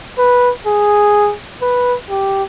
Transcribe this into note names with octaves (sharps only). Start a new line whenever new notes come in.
B4
G#4
B4
G4